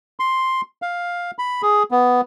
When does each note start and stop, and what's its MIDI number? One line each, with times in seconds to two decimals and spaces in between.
0.20 0.61 84
0.82 1.31 77
1.39 1.62 83
1.63 1.83 68
1.91 2.21 59